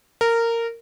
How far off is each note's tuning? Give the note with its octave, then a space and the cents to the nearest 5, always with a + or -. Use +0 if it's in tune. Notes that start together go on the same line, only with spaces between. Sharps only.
A#4 -15